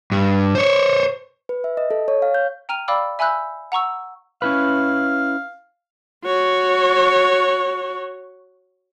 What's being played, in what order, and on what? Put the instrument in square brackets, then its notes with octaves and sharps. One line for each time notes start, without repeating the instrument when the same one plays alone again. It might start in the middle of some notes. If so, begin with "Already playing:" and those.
[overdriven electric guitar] G2
C5 C#5
[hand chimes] B4
E5
D#5
A4
C#5
F5
G6
[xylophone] G5 A#5 F6 D#7 F7
D5 F5 G5 B5 D6 E6
E5 G#5 B5 E6 F#6 G6
F#5 A#5 C#6 E6
[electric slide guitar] C#4 E4 B4 [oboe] F5
[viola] F#4 C#5